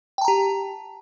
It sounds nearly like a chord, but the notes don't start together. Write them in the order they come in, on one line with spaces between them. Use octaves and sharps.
G5 A5 A#5 G4